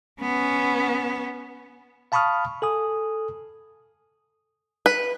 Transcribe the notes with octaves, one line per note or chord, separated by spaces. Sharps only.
B3 C#4
F5 A5 B5 C#6 D#6 F6
A4 G#5 D#6
B4